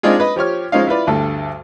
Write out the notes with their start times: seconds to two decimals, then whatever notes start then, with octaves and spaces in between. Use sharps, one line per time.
0.03 G#3 C4 D4 D#4 F4 G#4
0.20 B4 D#5
0.36 F3 G4 C#5 F6
0.72 F3 G#3 C#4 D#4 F5
0.87 E4 F4 B4 D5
1.07 D2 G2 A4